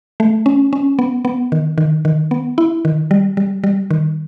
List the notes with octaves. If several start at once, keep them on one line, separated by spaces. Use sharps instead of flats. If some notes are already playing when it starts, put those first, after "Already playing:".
A3
C#4
C#4
B3
B3
D#3
D#3
D#3
B3
E4
D#3
G3
G3
G3
D#3